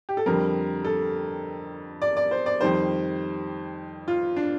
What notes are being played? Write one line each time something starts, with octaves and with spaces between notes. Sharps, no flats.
G4
A4
F2 D3 G3 A#4
A4
D5
D5
C5
D5
F2 D#3 G3 C5
F4
D4